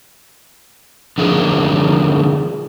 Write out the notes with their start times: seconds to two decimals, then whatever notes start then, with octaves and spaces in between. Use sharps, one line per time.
1.18 D3 F3 D#4 F4 G#4 A#4